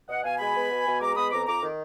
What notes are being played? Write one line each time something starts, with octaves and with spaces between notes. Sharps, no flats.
B2 D#5 F#5
B2 F5 G#5
G#3 G#5 B5
B3
B2
B2
G#3 A#5 D6
B3 B5 D#6
F2 A#5 D6
F2 A#5 D6
D#3